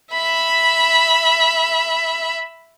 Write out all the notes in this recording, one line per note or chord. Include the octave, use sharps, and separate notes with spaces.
E5 B5